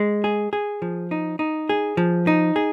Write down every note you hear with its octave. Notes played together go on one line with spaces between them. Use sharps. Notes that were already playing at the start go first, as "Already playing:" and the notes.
Already playing: G#3
G#4
G#4
F3
D#4
D#4
G#4
F3
D#4
G#4